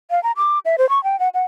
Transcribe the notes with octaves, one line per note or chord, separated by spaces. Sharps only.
F5
A#5
D6
E5
C5
C#6
G5
F#5
F#5